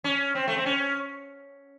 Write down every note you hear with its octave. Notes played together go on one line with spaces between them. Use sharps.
C#4
C4
A3
C4
C#4